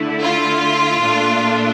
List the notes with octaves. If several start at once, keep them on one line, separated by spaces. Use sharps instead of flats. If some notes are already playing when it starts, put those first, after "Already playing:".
Already playing: D3 A3 E4
F4
A#2 A3 D4